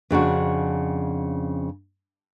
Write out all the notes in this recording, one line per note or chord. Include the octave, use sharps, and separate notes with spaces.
F2 C#3 D4 F#4